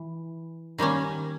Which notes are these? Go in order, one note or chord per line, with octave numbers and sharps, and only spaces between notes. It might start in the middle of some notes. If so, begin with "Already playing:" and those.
Already playing: E3
D#3 G3 A#3 C#4